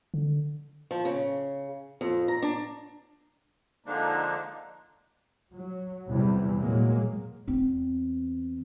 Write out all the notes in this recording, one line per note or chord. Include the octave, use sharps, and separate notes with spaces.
D3
F3
C#3
F2
A#5
D4
D3 F3 G#3 A#3 D4 D#4
F#3
E2 C3 E3 G3
A#2 F#3 G#3 A#3
E2 C4